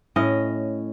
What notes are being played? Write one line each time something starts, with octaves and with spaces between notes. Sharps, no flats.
A2 C#4 D#5